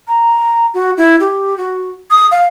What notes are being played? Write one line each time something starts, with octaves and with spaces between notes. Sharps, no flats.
A#5
F#4
E4
G4
F#4
D#6
F5